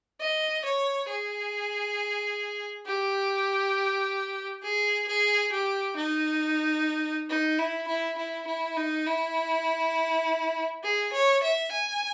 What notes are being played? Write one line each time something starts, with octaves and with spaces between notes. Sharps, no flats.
D#5
C#5
G#4
G4
G#4
G#4
G4
D#4
D#4
E4
E4
E4
E4
D#4
E4
G#4
C#5
E5
G#5